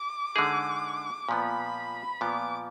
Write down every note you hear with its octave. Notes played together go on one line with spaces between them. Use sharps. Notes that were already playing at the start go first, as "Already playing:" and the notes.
Already playing: D6
D3 G#3 D#4 G#4
A#2 F3 B3 B5
A#2 F3 B3 D6